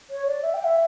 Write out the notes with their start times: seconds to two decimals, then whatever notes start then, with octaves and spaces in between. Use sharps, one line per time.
0.10 C#5
0.26 D5
0.43 E5
0.54 G5
0.64 E5